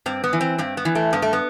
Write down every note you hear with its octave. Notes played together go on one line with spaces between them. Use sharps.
G2 C4
B3
E3
C4
G2 C4
B3
E3
A3
G2 B3
A3
B3